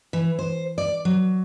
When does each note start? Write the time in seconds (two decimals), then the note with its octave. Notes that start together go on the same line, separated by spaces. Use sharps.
0.13 E3
0.39 C5
0.78 D5
1.05 F#3